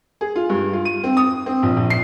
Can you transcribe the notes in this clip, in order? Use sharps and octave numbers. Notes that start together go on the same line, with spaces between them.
G#4
F4
G2
F4
D#7
C4
D#6
C4
A#1
A#1
C7